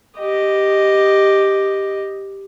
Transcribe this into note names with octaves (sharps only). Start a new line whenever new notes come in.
G4 D#5